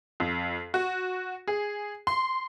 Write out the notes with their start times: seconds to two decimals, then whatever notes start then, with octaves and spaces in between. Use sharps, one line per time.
0.20 F2
0.74 F#4
1.48 G#4
2.07 C6